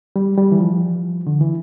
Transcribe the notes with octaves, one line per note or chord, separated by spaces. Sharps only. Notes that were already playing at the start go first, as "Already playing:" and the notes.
G3
G3
E3
F3
D3
E3